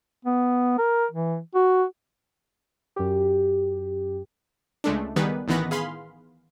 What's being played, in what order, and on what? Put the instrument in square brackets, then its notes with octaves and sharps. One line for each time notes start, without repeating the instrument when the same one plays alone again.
[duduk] B3
A#4
E3
F#4
[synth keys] F#2 G4
[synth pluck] C#2 G#3 A3 D4
D#3 G3 B3 D#4 G#4 B4
A1 D#3 E3 B3 B4 A#6
G#4 F5 B5 C6